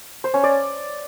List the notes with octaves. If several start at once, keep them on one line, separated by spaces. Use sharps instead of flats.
C5
C#4
D5